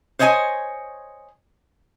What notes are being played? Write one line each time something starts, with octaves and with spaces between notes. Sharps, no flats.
C5 C#5 D#5 F5 G#5